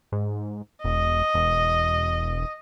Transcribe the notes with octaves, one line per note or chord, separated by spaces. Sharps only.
G#2
E1 D#5
E1